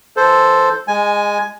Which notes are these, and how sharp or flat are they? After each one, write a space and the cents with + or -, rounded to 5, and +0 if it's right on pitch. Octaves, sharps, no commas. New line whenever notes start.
E3 +10 A4 +0 C5 +0
G#3 -15 G#5 +5